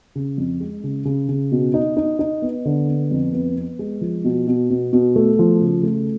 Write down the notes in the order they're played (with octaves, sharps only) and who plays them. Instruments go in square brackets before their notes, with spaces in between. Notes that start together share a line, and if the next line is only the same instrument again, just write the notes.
[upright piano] C#3
F2
G#3
C#3
C#3
C#3
B2
D#4
D#4
D#4
B3
D3
B3
F2
B3
B3
G#3
F3
B2
B2
B2
B2
A3
F3
C#3
A3